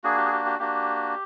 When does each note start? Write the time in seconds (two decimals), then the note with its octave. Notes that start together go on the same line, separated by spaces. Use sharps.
0.04 A#3 D4 F#4 G#4
0.17 G4
0.25 G#4
0.32 G4
0.46 G4
0.59 A#3 D4 F#4 G4